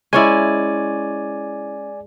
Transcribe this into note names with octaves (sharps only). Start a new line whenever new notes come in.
G#3 C#4 E4 D5 G#5